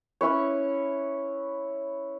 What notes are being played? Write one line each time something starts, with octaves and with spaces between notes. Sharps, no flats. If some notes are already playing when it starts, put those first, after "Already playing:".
C#4 E4 B4 C#5